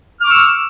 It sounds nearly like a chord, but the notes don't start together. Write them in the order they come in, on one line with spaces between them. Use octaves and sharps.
F6 D6 C#6 E6